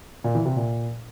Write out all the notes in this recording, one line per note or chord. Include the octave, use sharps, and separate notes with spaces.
A#2
E3
C3
A#2